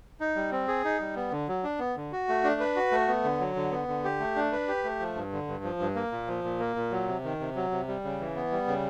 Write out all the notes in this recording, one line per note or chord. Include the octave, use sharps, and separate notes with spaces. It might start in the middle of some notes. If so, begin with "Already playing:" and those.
D#4
G3
C4
G#4
D#4
G3
B3
D3
F#3
D4
B3
D3
F#4
A3
D4
B4
F#4
A3
B3
D3
F#3
D3
B3
D3
G4
A3
D4
B4
G4
A3
F3
G2
D3
G2
F3
G2
A#3
A#2
F3
A#2
A#3
A#2
F#3
C3
D#3
C3
F#3
C3
G3
C#3
E3
B3
G3
C#3